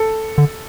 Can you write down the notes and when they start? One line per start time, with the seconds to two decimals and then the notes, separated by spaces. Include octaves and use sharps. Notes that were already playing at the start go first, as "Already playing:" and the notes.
Already playing: A4
0.38 D3